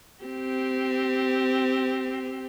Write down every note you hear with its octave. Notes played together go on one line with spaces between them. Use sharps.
C4 G4